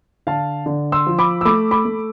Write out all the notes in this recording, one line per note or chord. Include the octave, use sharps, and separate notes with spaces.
D3 F5 A5
D3
C6 E6
F3
B5 D6
E6
A3 B5 D6
B5 D6
A3